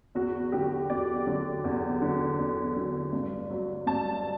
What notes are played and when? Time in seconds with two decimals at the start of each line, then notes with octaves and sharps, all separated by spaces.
0.15 E2 F#4
0.52 D3 F#3 G4
0.90 E2 D5
1.27 D3 F#3
1.64 E2
2.02 D3 F#3
2.39 E2
2.76 D3 F#3
3.13 G2
3.50 F#3
3.87 G2 A5